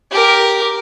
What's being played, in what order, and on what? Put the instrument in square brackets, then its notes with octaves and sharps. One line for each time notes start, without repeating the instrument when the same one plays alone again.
[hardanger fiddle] G4 A#4